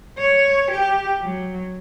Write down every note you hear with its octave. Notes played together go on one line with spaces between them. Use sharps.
C#5
G4
F#3